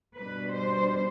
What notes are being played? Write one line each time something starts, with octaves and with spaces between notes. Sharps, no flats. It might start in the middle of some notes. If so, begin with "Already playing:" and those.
B2 G3 D4 B4
C5